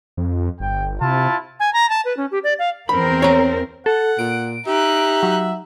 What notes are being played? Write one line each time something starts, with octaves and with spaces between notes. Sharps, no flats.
F2
G1 G5
C3 E4 F4 A5
G#5
A#5
A5
B4
C#4
G4
D5
F5
E2 C4 A#4 B5
C#5 A#5
A4 F#5
A#2 D7
D#4 G4 E5 F#6
F#3